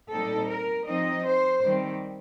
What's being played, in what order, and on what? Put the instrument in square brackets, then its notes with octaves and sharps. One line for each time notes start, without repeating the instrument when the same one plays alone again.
[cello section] A#2 G3 C4 D#4 A4
A#4
F3 C4 D#4 D#5
C5
D#3 G3 C4